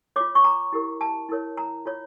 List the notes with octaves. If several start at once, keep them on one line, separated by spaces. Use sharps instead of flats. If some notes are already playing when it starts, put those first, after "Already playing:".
F4 C#5 D6
C#6
A#5
E4 G4 A#4
A5
E4 A#4 C#5
A#5
F4 C#5